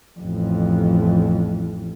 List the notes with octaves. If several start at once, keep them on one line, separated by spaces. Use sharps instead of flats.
A1 F2